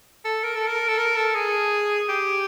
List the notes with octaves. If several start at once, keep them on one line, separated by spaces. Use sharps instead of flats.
A4
A#4
A4
A#4
A4
A#4
A4
G#4
G4